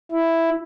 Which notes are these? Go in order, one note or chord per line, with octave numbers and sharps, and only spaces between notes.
E4